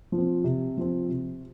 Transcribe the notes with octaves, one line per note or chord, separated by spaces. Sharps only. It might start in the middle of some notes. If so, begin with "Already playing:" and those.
F3
C4
C3
F3 C4
C3